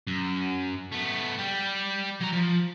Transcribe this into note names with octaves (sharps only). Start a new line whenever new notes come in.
F#2
A3 B3
G3 G4
F#3 A#5
F3